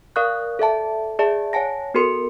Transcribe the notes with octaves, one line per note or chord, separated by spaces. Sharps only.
A#4 D5 F5 C#6 D#6 F#6
A4 D5 E5 A5
G#4 D5 E5 A5
C#5 F#5 G#5 A5 A#6
B3 F#4 A4 A#4 C6 C#7